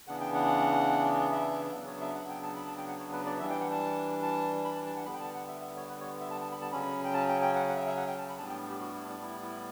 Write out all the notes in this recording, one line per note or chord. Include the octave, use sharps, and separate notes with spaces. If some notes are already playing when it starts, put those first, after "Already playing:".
C#3 E3 B3 D4 F#5
G5
F#5
E5
C#3 F#3 B3 D4
C#5
E5
F#5
G5
A5
B5
A5
G5
F#5
C#5
B4
D5
E3 G3 D4 E5
G5
F#5
A5
A5
B5
A5
A5
F#5
D3 G3 B3 B5
G5
A5
F#5
E5
E5
C#5
B4
C#5
E5
A5
A5
B5
A5
C#3 F#3 C#4 B5
G5
A5
G5
G5
F#5
F#5
E5
E5
F#5
G5
A5
B5
A2 G3 B3 D4 A5
G5
G4
F#4
E4
D4
E4
E4